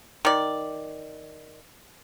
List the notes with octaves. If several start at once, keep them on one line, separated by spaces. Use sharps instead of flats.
D#3 D5